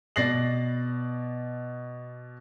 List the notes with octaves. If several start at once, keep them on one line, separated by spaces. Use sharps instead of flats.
B2 D5 A6 A#6 C7 F#7